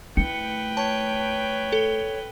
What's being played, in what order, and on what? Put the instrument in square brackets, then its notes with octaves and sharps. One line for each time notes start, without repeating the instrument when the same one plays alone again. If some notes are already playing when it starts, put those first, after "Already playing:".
[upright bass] A3 E4 [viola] B4 G5 [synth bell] C#7
[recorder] C#5 [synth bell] A5
[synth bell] A4